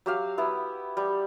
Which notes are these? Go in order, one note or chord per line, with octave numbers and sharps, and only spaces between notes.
F#3 G4 F5
B3 E4
G3